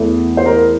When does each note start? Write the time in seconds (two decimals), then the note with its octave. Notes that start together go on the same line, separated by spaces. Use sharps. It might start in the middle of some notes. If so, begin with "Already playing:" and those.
Already playing: E2 E3 A3 E4
0.37 C5
0.46 A#4